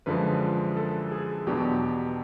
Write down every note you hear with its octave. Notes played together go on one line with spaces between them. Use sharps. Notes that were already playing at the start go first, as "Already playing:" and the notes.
F#2 D3 F3 G#3 B4
A4
G#4
E2 B2 F#3 B3 D4 G4